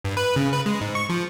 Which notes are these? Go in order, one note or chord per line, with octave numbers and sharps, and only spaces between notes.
G2
B4
C#3
B4
G#3
G#2
C#6
F3